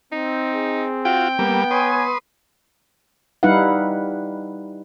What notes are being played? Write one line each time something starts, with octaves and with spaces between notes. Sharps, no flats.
C4 D#4
G#4
F4 F#4 G5
G3 A#3 B3
B4 C#5 G#5 C6 D#6
G3 D#4 E4 B4 F5 F#5